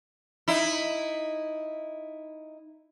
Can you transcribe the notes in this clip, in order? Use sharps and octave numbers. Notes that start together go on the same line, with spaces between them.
D#4 E4